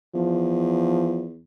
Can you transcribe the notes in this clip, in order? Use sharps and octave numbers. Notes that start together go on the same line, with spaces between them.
E2 F3